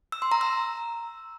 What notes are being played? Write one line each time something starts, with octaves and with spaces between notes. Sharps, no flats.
E6
C6
A#5
E6